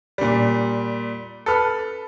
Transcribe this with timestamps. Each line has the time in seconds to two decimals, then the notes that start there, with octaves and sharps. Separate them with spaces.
0.18 A#2 G3
1.46 A4 B4 F6